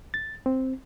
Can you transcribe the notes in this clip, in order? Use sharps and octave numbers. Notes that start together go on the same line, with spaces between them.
A6
C4